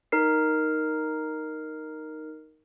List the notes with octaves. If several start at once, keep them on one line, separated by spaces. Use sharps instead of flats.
D#4 A#4 C7